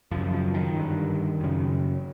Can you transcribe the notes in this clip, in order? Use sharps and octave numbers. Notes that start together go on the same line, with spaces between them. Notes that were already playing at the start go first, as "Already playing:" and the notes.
F#2 C#3 F3
F3
D#3
G2 D3
F#2 C#3